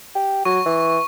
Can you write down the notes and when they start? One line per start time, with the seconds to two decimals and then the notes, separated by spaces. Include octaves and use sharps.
0.15 G4
0.45 F#3 C#6
0.66 E3